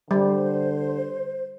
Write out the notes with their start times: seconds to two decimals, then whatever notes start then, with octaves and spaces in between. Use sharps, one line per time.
0.11 D3 G3 C5